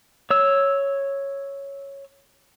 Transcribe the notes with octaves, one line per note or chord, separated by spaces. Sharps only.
C#5 E6